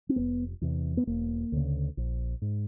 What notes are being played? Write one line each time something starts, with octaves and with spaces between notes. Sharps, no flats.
C4
F1 B3
E2 C3
B3
E1 A#3
D2 C#3
A#1
G#2